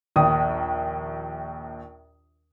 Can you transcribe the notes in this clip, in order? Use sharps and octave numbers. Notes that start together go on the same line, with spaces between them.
A#1 D#2 D#6